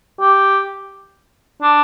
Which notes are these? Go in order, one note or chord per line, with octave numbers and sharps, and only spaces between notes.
G4
D4